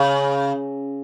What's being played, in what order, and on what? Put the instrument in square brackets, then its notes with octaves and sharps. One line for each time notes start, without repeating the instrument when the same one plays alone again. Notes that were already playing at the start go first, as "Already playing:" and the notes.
Already playing: [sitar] C#3